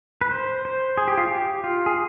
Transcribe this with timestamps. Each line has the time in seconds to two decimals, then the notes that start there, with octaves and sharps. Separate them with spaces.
0.21 B4
0.31 C5
0.65 C5
0.97 G#4
1.08 G4
1.18 F4
1.27 G4
1.64 F4
1.86 G#4